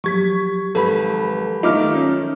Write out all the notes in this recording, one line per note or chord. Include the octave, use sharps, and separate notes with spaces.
F3 F#3 G4 C#6 G#6 B6
G#1 A4 B4 B5
D#3 A3 D#4 F4 D6 F6
C#4